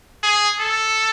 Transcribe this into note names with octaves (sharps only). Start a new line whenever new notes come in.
G#4
A4